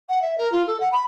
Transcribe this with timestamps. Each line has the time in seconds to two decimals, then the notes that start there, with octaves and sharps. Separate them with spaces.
0.08 F#5
0.22 E5
0.37 A#4
0.52 F4
0.67 A4
0.80 F#5
0.92 B5